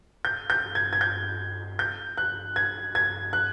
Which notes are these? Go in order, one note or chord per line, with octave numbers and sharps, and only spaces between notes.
G6
G6
G#6
G#6
G6
G6
F#6
G#6
G#6
F#6